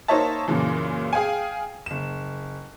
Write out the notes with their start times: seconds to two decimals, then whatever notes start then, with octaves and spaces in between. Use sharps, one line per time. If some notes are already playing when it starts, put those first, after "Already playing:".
0.08 A#3 D#4 C5 C#5 E5 A5
0.48 F#2 A#2 C#3 E3
1.13 G#4 F5 G5 G#5
1.86 F#1 E7